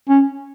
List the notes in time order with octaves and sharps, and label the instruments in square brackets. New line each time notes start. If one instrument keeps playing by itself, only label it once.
[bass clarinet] C#4